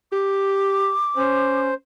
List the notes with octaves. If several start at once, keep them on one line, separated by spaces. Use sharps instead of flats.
G4 D6
C#4 C5